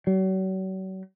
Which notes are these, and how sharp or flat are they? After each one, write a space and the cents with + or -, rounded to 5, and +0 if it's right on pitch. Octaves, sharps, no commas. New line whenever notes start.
F#3 +40